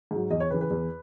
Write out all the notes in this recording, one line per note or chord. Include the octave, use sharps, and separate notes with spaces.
G#2 F#3
E2 D#5
C#5
C#3 E3 B4
B4
E2